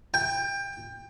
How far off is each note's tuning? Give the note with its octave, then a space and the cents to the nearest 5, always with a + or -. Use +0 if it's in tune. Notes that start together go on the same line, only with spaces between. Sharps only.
G5 +25